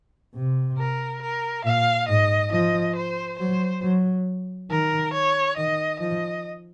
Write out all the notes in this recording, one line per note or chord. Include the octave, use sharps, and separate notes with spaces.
C3
A#4
A#4
A#2 F5
G#2 D#5
F3 D#5
C5
F#3 C5
F#3
D#3 A#4
C#5
D#3 D#5
F3 D#5